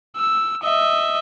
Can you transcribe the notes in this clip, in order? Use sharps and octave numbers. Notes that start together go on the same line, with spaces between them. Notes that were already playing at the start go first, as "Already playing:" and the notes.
E6
D#5 E5